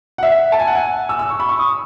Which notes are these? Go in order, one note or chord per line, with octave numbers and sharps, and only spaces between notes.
F#5
E5
A5
G#5
F#5
G#5
E6
E6
C#6
B5
C#6
D#6